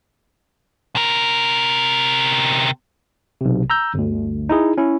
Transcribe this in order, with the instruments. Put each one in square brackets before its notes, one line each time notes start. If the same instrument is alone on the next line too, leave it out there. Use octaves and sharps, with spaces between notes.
[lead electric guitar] C3 A#4
[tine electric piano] B1 C3
A#5 E6 G6
G1 D2
D#4 E4 G#4
C#4 E4